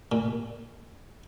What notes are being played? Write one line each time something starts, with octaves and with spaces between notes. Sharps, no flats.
A#2